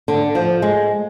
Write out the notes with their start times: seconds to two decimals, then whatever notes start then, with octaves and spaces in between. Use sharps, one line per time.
0.08 D3
0.35 F3
0.62 G#3